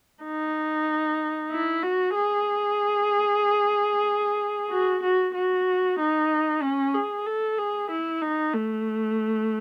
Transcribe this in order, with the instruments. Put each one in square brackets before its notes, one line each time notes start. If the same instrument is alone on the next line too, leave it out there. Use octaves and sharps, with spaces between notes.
[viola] D#4
E4
F#4
G#4
F#4
F#4
F#4
D#4
C#4
G#4
A4
G#4
E4
D#4
A3